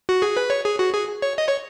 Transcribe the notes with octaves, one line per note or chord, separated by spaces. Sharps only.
F#4
G#4
B4
C#5
G#4
F#4
G#4
C#5
D#5
C#5